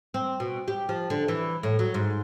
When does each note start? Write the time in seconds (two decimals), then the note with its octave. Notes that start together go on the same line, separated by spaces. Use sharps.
0.14 C4
0.40 B2
0.68 G4
0.89 F3
1.10 D3
1.28 E3
1.63 A2
1.79 F#3
1.94 G#2